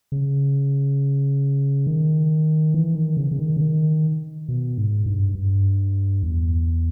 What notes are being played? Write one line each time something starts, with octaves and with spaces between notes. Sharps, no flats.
C#3
D#3
E3
D#3
C#3
C#3
D#3
C#3
D#3
B2
G#2
G2
G2
E2